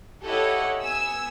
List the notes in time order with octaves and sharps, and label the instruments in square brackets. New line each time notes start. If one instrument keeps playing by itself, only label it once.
[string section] E4 G4 A4 C#5 D#5 F#5
B3 G#5 E6